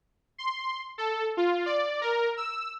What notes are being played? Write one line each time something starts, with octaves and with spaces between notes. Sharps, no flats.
C6
A4
F4
D5
A#4
E6